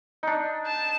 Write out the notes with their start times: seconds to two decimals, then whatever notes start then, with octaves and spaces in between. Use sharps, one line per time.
0.23 D4 D#4
0.66 A5